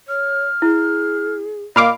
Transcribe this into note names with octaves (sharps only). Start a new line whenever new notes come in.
C#5 F6
E4 G#4
A#2 D#5 F5 B5 D6